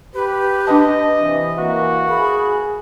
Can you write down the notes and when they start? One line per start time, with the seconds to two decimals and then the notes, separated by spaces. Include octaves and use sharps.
0.15 G4 B4
0.67 D4 B4 D#5 A5
1.20 C3 E3 E5
1.58 E3 A#3 F#4
2.09 G#4 B5